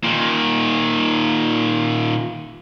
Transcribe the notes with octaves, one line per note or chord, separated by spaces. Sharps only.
A#2 D#3